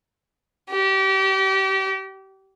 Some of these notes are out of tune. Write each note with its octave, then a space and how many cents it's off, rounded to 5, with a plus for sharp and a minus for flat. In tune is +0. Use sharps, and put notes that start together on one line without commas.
G4 -30